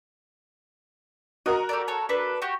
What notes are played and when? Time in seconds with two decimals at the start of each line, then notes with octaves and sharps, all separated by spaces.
1.46 F#4 A#4 D#5 A#5
1.69 G4 A4 D5
1.88 A4 C#5 A5
2.09 D4 A4 B4
2.42 F#4 G4